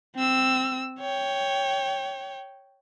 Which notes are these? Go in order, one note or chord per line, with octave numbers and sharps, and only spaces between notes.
C4 E6
C#5 G5